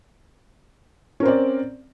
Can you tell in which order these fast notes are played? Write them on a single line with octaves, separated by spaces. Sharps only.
C#4 A#4 C4 D5